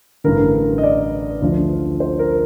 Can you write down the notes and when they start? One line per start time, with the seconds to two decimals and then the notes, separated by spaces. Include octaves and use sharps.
0.24 A1 G2 D3 A#4
0.78 D#5
0.83 D5
1.42 D2 D3 F3
2.00 C5
2.19 A#4